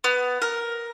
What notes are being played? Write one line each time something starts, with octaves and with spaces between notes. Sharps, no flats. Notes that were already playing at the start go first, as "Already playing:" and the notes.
B3
A#4